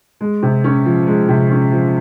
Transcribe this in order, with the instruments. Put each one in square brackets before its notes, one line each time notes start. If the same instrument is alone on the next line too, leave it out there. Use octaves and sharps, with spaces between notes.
[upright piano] G#3
C3
C#4
F3
G#3
C3
C#4
F3